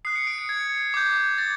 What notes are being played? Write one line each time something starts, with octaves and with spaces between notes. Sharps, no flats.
D#6 F#6 C7
C#7
D7
C#7
G#6
D6 G6
A6